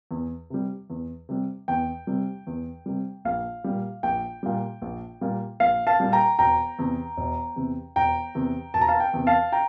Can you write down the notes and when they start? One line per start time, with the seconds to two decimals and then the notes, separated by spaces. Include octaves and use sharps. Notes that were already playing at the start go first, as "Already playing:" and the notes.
0.11 E2
0.50 C3 G3
0.90 E2
1.29 C3 G3
1.68 E2 G5
2.07 C3 G3
2.47 E2
2.86 C3 G3
3.25 A#1 F5
3.64 A#2 G3
4.03 A#1 G5
4.43 A#2 G3
4.82 A#1
5.21 A#2 G3
5.60 A#1 F5
5.87 F5 A5
6.00 A#2 G3
6.12 G5 A#5
6.39 E1 G5 A#5
6.78 E2 C3
7.17 E1
7.56 E2 C3
7.96 E1 G5 A#5
8.35 E2 C3
8.74 E1 A5
8.81 A#5
8.88 F5 A5
9.00 G5
9.14 E2 C3
9.27 F5 A5
9.52 G5 A#5